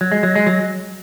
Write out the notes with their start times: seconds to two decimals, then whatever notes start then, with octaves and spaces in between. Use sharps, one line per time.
0.01 F#3
0.12 G#3
0.23 F#3
0.36 G#3
0.47 F#3